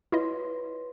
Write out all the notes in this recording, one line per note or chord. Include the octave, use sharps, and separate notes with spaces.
E4 F4 B4 C#5 D#5 C6